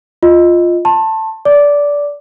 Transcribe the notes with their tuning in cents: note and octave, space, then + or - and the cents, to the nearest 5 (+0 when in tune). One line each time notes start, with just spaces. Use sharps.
F4 +0 D#5 +0
A5 +10 C6 +40
D5 -20 D6 +0